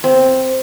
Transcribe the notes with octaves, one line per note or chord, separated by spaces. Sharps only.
C4